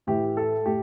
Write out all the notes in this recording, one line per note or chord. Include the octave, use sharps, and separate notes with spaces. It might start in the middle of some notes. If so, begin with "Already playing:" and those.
A2 E3 G4
A4
A2 G4